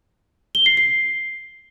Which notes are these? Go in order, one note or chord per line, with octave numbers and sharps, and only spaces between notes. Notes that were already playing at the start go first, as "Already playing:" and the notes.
G7
C7
C7